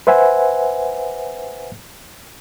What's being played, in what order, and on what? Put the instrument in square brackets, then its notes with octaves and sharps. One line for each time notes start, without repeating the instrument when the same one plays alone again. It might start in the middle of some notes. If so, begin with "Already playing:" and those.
[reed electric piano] B4 C5 E5 F#5 G#5